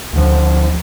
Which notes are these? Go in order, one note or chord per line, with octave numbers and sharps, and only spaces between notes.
D2 D3 F3